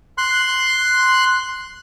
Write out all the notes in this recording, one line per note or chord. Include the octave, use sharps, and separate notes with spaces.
C6 F#6